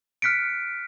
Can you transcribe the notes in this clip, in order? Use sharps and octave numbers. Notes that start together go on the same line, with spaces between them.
F6 F#6 B6 C#7 D7